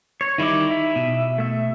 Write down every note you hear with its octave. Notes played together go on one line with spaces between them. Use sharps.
C#5
D#3 G3 D#4 E4 D6
E5
B2
A3 E5